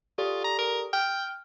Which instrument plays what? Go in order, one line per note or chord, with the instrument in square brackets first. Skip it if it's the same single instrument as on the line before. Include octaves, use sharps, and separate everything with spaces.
[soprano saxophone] F4 [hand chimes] G4 A4 D5
[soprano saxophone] A#5
A#4
[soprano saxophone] G5 [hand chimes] F6